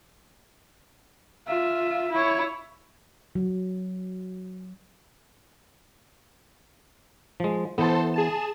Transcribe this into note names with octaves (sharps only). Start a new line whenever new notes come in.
F4 E5
E4 C#5
F#3
F3 G#3
E3 B3 A4 C5 A5
G#4 A5 E7